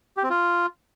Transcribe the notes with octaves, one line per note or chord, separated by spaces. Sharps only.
G4
C4
F4